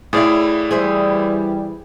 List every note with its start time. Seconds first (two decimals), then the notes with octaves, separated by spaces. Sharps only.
0.13 A2 E4 G#4 D5 F5
0.71 E3 G3 G#4 C5 E5